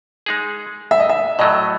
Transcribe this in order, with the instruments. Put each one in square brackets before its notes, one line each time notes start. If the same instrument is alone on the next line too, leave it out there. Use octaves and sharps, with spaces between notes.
[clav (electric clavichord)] G#3 D#4 G#4
[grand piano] E5
D#5
E5
[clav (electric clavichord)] A2 F#3 A3 [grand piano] D#5